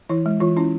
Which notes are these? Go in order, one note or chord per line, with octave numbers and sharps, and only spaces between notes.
E3 E4
G#3
E3 F4
C#4 E4